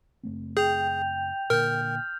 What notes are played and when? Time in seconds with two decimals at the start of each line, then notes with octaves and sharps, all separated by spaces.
0.23 F#1 A3 C4
0.57 G#4 G5 G6 F7
1.50 A#2 D3 A#4 F6 G6